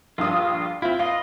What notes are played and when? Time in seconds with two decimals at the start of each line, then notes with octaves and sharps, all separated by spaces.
0.18 A#1 G2 F4 D#6
0.82 C4 E4 F4
0.99 F4 B4 D#5 F5